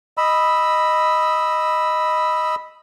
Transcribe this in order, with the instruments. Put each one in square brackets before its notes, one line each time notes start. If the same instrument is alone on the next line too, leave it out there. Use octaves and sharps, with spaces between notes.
[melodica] D#5 B5 E6